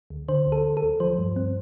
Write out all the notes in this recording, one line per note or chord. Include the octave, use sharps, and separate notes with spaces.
D2
D3 C5
D2
A4
D2
A4
D2
F3 C5
G2
C4